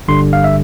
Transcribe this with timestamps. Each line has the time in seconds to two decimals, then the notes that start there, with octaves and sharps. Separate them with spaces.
0.08 G1 G2 D3 G3 C6
0.33 F5
0.44 E5